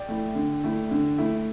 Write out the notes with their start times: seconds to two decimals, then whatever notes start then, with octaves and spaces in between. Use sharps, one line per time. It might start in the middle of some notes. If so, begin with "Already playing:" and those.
Already playing: D5 G5
0.09 A3 E4
0.35 D3
0.64 A3 E4
0.91 D3
1.18 A3 E4